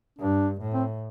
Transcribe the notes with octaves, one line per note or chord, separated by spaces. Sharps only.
G2 D4
A2
C4